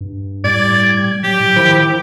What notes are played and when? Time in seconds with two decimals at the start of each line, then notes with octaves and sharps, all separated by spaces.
0.01 G2
0.44 A2 G3 D5 G#6
1.24 F#3 G4
1.40 A2
1.56 D#3 F3 E4 G5